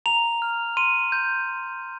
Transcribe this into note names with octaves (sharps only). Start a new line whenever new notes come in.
A#5 F7
F6
C6 D#7
G6